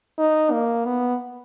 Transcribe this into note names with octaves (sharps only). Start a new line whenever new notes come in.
D#4
A#3
B3